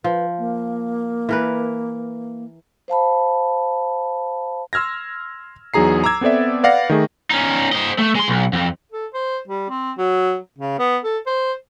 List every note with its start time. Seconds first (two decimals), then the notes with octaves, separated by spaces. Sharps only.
0.04 F3 B4
0.38 A#3
1.29 E3 A#4 B4
2.88 C5 F5 A5 B5
4.73 C6 E6 F6 G#6 A#6
5.74 E2 F#3 D#4 G#4 A#5 C7
6.04 A#5 D6 E6 G#6
6.21 B3 C4 A4 D5 E5
6.63 B4 D5 F5 F#5 A#6
6.90 D#3 A3 G#4
7.30 C#4 D#4
7.72 C5 D#5
7.98 A3
8.15 G#3 C6
8.28 B1
8.53 F2
8.92 A4
9.14 C5
9.48 G3
9.70 C4
9.98 F#3
10.58 C#3
10.79 B3
11.04 A4
11.27 C5